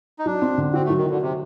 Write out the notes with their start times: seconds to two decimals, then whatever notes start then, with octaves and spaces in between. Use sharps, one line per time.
0.19 D#4
0.26 F#3 D4
0.42 C4
0.58 D3
0.73 C4 F#4
0.85 A3
0.90 F#3
0.98 D#3
1.06 D3 F#4
1.22 C3